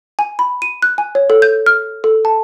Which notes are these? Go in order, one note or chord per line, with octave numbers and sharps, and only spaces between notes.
G#5
B5
D#7
F#6
G#5
C#5
A4
G6
F6
A4
A5